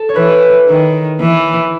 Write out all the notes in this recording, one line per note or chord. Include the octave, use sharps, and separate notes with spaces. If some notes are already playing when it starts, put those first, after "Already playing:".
Already playing: A4
C#5
E3 B4
D#3
E3